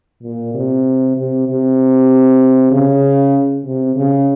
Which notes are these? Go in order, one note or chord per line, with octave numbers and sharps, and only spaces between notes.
A#2
C3
C3
C3
C#3
C3
C#3